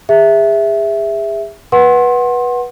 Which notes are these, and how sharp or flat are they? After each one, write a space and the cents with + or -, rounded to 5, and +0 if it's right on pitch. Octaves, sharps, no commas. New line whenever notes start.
G#4 -35 E5 +0
B4 -20 F#5 +0 C6 +25